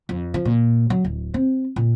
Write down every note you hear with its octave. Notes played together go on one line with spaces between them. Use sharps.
F2
F3
A#2
F#3
D1
C4
A#2